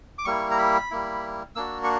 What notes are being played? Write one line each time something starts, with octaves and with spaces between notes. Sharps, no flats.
D6
G3 A#3 E4 C#6
A#5
B5
G3 A#3 E4
A#3 D4 F#4 E6
C#6